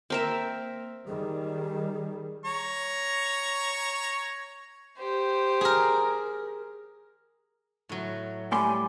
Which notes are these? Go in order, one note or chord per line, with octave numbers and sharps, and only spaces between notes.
A#3 C4 A#4 E5
D#3 G3 G#4
C#5 A#5 C#6
G4 C5
G#4 A#4
A2 F#3
G3 A3 G#5 B5 C6 D6